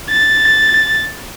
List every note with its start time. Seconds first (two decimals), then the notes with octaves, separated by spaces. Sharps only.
0.10 A6